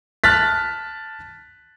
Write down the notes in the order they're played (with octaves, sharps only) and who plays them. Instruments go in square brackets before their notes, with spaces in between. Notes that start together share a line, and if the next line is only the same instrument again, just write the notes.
[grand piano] A5 F6 F#6 A6 B6